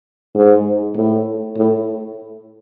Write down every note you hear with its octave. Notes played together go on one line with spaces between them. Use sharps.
G#2
A2
A2